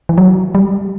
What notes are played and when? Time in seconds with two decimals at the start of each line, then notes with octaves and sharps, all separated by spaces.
0.09 E3
0.18 F#3
0.55 G3